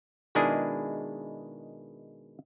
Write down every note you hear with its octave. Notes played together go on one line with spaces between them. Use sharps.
B2 D#3 G#3 D4 E4 G#4